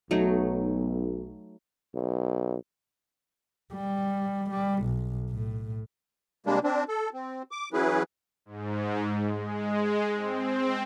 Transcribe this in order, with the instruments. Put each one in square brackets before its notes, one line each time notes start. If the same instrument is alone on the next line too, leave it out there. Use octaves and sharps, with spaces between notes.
[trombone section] B1 [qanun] F#3 A3 D#4
[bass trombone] B1
[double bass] G3
G3
B1
A2
[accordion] C3 G3 G#3 A#3 D4
C4 D4
A4
C4
D6
E3 F#3 C#4 E4 G#4 B4
[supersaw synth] G#2
G#3
C4